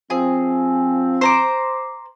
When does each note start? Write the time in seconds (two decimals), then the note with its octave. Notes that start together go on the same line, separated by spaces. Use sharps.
0.10 F3 C4 G#4
1.21 C5 A#5 D6